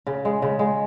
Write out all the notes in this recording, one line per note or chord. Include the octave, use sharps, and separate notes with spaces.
C#3
G#3
C#3
G#3